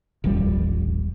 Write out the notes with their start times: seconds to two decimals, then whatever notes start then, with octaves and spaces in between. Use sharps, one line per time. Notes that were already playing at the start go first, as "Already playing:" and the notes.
0.24 D#1 A1 F2 G3